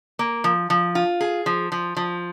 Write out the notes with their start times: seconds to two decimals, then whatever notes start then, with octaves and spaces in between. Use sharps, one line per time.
0.19 A#3
0.44 F3
0.70 F3
0.95 F4
1.21 G#4
1.46 F3
1.72 F3
1.97 F3